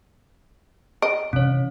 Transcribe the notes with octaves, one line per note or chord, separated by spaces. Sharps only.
D#5 D7
C3 E3 C#4 C#5